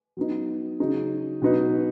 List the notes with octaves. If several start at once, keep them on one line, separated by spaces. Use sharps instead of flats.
F#3 B3 D#4
C#3 F#3 D#4 G#4
B2 F#3 B3 D#4 B4